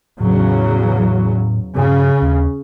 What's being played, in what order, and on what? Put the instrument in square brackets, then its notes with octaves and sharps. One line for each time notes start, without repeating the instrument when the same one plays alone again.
[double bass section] E2 C#3 F#3 [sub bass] A2
[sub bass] G2 [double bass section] C#3
[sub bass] D#2